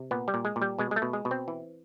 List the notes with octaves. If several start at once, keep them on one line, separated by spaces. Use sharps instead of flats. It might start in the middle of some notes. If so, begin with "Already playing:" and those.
Already playing: C3
A#2 B3
G3
A#2
G#3
A#2
G3
B2 G#3
G#3
A3
B2
G#3
B2
C4
E3